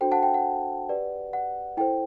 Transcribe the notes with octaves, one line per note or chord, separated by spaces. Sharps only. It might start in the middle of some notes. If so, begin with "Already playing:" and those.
D4 F#4 A4 C5 G5
F#5 A5
G5
F#5
G4 B4 D5
F#5
E4 A4 C5 G5